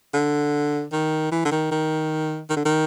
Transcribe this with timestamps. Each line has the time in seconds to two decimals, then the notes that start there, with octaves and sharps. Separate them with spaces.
0.14 D3
0.93 D#3
1.32 E3
1.45 D3
1.52 D#3
1.71 D#3
2.50 D#3
2.57 D3
2.65 D#3